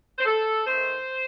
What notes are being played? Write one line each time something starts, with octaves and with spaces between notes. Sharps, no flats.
C5
A4
D#3 A3 D#4 C5